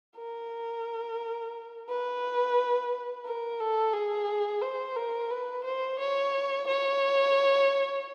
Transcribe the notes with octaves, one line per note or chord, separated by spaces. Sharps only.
A#4
B4
A#4
A4
G#4
C5
A#4
B4
C5
C#5
C#5